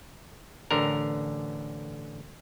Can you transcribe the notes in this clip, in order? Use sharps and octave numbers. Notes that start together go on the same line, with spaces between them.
A1 D3 A#4